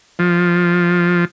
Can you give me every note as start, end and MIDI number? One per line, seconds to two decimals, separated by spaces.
0.19 1.25 53